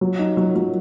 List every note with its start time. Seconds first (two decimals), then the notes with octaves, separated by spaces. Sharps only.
0.01 F#3
0.19 D#4
0.37 F#3
0.56 F#3